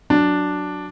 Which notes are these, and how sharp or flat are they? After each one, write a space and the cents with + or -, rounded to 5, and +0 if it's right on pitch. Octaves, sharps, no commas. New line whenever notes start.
F#3 +0 D4 +0 D5 +0